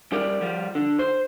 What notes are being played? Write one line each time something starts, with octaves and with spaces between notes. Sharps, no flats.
G3 G4 A#4 D5
F3 G3
D3
C5